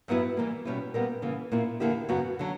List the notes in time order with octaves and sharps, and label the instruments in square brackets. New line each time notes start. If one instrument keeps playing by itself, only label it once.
[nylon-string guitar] G2 F#3 B3 E4 B4
E3 G3 A#3
B2 G3 C#4 E4 B4
A#2 G3 B3 E4 A#4
C#3 E3 A#3
A#2 A#3 E4
E2 D3 A#3 E4 G4
F#2 C#3 F#3 B3 F#4
D3 F#3